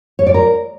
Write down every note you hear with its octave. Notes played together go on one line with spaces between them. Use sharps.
C#5
D5
A#4